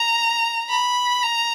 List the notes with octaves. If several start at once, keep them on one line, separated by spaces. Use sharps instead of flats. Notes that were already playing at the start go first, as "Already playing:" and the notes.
Already playing: A#5
B5
A#5